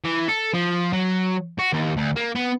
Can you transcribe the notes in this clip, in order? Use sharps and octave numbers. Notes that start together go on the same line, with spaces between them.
E3
A4
F3
F#3
F#4
D#2
D2
A#3
B3